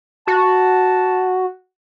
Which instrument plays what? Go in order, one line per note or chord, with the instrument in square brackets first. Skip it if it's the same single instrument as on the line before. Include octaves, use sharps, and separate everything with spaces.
[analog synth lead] F#4 [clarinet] A5